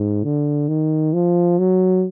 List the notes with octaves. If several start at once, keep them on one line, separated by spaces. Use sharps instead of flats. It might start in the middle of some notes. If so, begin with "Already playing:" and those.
Already playing: G#2
D3
D#3
F3
F#3